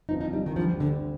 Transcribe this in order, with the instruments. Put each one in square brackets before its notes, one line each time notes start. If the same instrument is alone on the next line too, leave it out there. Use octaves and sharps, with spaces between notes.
[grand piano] G1 G2 F3 C4 [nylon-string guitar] D#4
[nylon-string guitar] D#4
G3
D#3
[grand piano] D2 D3 G3 [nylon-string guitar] F3
[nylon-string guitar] D3